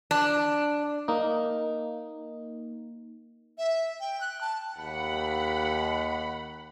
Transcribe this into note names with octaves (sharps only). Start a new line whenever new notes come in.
D4
A#3 D#4
E5
G5
F#6
A5
D#2 F#5 B5